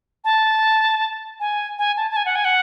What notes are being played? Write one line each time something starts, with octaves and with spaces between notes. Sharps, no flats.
A5
G#5
G#5
A5
A5
G#5
F#5
G#5
F#5